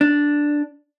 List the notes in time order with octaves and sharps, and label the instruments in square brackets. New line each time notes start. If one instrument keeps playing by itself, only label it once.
[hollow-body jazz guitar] D4